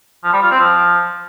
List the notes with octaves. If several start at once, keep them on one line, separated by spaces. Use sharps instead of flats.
F3
G3
F4
C4
F3